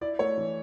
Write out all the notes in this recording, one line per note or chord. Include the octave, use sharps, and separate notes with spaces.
E4 D5
A3 C#5
E3